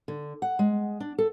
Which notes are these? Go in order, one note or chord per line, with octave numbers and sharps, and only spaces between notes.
D3
F#5
G#3
D4
A4